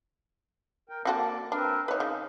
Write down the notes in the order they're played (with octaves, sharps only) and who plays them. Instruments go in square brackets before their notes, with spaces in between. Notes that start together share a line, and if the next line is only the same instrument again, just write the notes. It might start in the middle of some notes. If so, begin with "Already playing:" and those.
[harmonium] A#4 G5
[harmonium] A#3 D5 [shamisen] C4 F#4 A4
[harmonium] C4 A#4 B4 [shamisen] D4
[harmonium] D#4 [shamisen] B4 C#5
[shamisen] C#3